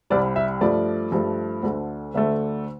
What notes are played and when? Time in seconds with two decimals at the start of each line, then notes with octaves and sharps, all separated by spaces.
0.10 C2 C3 G3 D5
0.36 E5
0.61 G2 F3 A3 D5
1.12 G2 F3 A3
1.63 D2 D3 A3
2.14 D2 D3 A3 E5